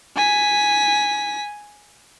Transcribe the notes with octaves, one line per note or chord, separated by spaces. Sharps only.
G#5 B6